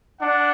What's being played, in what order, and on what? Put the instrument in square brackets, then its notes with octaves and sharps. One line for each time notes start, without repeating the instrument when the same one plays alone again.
[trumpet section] D4 [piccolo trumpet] F#5